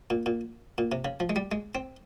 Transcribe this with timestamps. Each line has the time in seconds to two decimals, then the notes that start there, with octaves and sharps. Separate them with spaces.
0.10 A#2
0.26 A#2
0.78 A#2
0.92 C3
1.05 C#3
1.20 F3
1.29 G#3
1.36 G3
1.52 G#3
1.75 C4